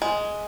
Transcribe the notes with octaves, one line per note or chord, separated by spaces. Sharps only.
G#3